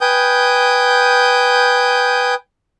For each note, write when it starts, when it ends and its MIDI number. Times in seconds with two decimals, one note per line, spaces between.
0.01 2.35 71
0.01 2.35 79
0.01 2.35 80
0.01 2.35 87
0.01 2.35 91